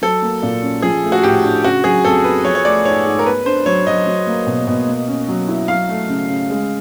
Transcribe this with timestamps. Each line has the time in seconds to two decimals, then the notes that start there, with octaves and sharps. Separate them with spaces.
0.02 F#3 A4
0.22 A#3
0.42 A#2
0.62 C#4
0.82 F3 G#4
1.03 A3
1.12 F#4
1.23 A2 G4
1.44 D4
1.64 C#3 F#4
1.84 F#3 G#4
2.05 F2 A4
2.24 B3 B4
2.44 F3 C#5
2.55 C#5
2.65 A3 D5
2.85 G#2 C#5
3.06 G#2
3.19 A#4
3.25 B3 B4
3.46 D4 C5
3.66 F#3 C#5
3.87 F#3 D#5
4.07 F#3
4.27 A#3
4.47 B2
4.67 B2
4.87 A#3
5.08 C#4
5.28 F#3
5.48 E4
5.68 F#3 F5
5.89 A3
6.09 C#3
6.29 C#3
6.50 G#3